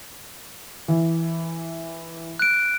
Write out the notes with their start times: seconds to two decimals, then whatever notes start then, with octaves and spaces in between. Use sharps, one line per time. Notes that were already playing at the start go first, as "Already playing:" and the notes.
0.88 E3
2.39 F#6 D7